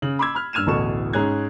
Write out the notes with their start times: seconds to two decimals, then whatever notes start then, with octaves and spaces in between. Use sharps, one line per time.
0.02 C#3 F#7
0.19 B5 C6 D6 E6 G#6
0.35 B5 F6
0.53 G2 E6 F6 G#6 D#7 E7
0.67 D1 A1 B2 A4 C#6 E7
1.13 G#2 C#4 G#4 F#6 G#6